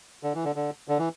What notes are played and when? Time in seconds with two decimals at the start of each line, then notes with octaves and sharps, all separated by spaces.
0.23 D3
0.35 E3
0.45 D3
0.56 D3
0.88 D3
0.99 E3